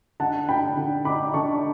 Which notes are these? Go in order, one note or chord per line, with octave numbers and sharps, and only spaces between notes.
D3 F#5 A5
D3 G5 B5
D3
D3 B5 D6
D3 A5 C#6